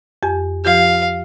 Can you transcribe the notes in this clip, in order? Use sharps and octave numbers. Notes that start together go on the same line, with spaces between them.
F2 G4 G#5
F3 F4 G4 F5